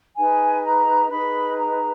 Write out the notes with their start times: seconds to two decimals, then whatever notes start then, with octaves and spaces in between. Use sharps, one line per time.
0.17 D#4 G#4 B4 G#5
0.64 A#5
1.10 D#4 G#4 B4 B5
1.57 A#5